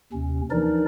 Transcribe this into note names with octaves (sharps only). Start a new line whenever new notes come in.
D#2 C3 C#4
E3 F3 D4 D#4 A#4 D5